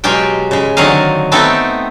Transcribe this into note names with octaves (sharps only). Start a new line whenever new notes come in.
B2 F#3 G#3 F4 G4 G5
C#3 G#3
D3 D#3 F#3 C4 D#5 F5
A3 B3 C4 D#4 A4 G5